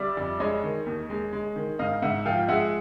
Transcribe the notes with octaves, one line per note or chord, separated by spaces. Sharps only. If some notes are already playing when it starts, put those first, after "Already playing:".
Already playing: G3 D5 E5
F2
G#3 C#5 D#5
D#3
D#2
G#3
G#3
D#3
G#2 D#5 F5
G#2 E5 F#5
F3 F5 G5
G#3 E5 F#5